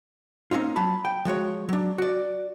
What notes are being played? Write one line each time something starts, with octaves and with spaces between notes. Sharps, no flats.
A#3 C4 C#4 D#4 F4
F#3 A5 B5
G5
F3 G#3 F#4 C#5
F#3 D4
F#4 D5